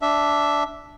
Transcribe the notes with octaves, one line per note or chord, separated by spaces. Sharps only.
D4 E5